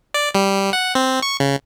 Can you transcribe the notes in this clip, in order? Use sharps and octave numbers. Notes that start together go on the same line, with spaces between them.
D5
G3
F#5
C4
C#6
C#3